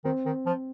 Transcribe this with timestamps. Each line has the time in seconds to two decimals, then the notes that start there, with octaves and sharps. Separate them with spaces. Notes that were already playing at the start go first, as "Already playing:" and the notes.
0.04 D#3 C4
0.25 D#3
0.46 F3